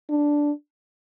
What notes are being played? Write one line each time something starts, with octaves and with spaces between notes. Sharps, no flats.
D4